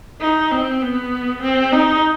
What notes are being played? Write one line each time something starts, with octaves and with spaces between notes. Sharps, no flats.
D#4
C4
B3
C4
D#4